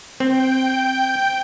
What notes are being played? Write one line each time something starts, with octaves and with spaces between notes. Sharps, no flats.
C4 G5 G6